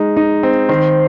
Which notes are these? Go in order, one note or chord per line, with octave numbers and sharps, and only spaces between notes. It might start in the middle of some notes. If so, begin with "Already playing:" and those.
Already playing: G#3 D#4
D#4
C4
D#3 C5